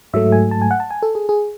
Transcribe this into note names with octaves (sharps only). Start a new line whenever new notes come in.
G#2 F#3 A3 E5
G#5
A5
G#5
F#5
A5
G#5
A4
G#4
G#4